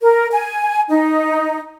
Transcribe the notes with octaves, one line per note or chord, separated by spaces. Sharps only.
A#4
G#5
D#4